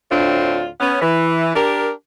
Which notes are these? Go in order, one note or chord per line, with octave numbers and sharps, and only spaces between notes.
D2 A2 C4 D4 F4
B3 C#4
E3
D4 G4 A#4